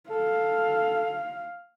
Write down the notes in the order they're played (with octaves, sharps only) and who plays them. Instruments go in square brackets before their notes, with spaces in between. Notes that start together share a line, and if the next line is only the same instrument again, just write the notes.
[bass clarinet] A4 [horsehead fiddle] F5